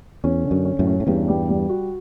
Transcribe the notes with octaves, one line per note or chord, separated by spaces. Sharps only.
E2 C#4
D3
F#2
C#4
F#2 A2
C#4
A2
E2 G2 G3
G3
G3
F#4